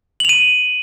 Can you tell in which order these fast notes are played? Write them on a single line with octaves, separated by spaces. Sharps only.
F#7 F7 D#7